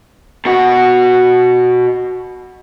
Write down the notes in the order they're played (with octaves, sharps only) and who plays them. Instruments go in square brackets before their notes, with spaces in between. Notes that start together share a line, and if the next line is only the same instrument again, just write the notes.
[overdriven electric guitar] B2 F#4